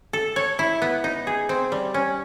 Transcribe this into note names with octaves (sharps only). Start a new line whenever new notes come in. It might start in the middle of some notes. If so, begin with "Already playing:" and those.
A4
C#5
E4
B3
D#4
G#4
C4
G3
C#4